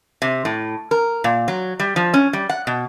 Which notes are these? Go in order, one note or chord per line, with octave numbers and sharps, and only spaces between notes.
C3
A2
A#4
A#2
F#3
G3
F3
C#4
G3
F#5
B2